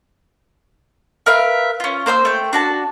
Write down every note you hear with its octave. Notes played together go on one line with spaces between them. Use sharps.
A#4 B4 E5 F5
C#4 F4
A#3 C5 G5 E6
A3 G5
D4 F#4 A5